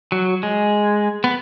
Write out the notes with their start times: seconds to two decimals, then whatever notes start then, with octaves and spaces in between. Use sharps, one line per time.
0.12 F#3
0.43 G#3
1.24 B3